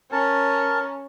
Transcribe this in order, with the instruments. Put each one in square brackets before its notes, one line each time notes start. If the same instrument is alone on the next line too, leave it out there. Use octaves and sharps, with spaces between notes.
[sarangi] C#4 [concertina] A#4 A5